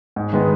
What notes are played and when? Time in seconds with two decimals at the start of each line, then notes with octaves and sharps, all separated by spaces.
0.16 G#2
0.33 D#3 G#3 B3 D#4